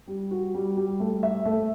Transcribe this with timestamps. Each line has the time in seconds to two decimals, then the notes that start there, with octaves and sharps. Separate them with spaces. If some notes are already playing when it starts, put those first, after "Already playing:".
0.08 G3
0.31 F#4
0.54 G3
0.77 G3
1.00 A3
1.23 E5
1.45 A3